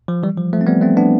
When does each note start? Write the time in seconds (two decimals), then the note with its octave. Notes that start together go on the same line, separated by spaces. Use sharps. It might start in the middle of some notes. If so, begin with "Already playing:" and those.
0.08 F3
0.23 E3 G3
0.38 F3
0.53 F3 A3
0.61 C4
0.67 G3 B3
0.81 A3 C4
0.97 B3 D4